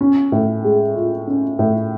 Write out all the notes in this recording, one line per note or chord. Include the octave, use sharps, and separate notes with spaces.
C#4
A2
G#3
F4
C#4
A2